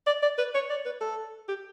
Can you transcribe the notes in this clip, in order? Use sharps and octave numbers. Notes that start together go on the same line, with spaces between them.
D5
D5
B4
C#5
D5
B4
A4
G4